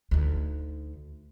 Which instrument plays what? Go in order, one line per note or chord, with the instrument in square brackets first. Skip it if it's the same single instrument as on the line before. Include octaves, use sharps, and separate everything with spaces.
[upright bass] D2 D#4